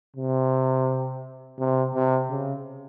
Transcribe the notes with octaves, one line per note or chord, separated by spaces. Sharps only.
C3
C3
C3
C#3